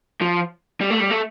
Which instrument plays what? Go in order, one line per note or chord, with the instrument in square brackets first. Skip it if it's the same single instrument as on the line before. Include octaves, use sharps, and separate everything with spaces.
[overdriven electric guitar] F3
G3
A3
G3
A3